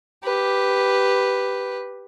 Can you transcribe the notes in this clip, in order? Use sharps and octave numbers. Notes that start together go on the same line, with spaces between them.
G4 B4